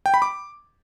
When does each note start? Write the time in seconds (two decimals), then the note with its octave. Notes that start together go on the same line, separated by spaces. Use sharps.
0.06 G5
0.14 B5
0.22 D6